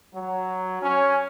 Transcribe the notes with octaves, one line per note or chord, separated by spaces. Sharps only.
F#3
C#4